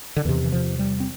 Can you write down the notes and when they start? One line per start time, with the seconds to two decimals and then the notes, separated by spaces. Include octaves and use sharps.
0.16 D3
0.25 E2 C3 E3
0.44 E3
0.52 F3
0.79 G3
1.00 C4